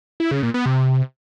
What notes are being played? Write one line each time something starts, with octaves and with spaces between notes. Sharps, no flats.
E4
C#3
A#2
B3
C3